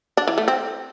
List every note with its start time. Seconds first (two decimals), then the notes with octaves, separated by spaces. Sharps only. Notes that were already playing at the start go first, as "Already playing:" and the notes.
0.17 D4
0.28 E3
0.38 A3
0.48 C4